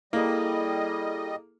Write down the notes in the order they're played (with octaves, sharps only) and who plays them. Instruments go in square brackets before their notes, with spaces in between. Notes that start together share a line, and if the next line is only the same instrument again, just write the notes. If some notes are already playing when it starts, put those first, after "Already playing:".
[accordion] G3 D#5 [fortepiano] A#3 [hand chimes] E4 G#4 A4